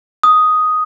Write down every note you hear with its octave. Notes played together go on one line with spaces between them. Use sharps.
D#6